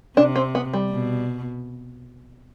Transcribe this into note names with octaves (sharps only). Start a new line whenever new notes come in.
C3 D4
C4
B3
G3
B2